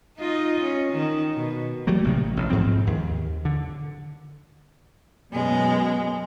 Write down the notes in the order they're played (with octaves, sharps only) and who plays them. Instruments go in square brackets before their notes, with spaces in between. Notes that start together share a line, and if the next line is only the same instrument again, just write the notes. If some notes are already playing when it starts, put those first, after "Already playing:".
[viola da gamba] D#4 F4 D#5
C#4
D#3
B2
[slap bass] F#3 G3 A3 A#3
A1 C3 D#3
A1
G#2 F3 C4
D#2
D3
[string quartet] F#2 B2 G#3